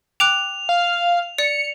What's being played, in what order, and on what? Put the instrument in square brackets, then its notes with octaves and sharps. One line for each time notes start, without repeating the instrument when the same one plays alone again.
[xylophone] G5 D6 F#6 [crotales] F7
[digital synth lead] F5
[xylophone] D5 [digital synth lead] C#7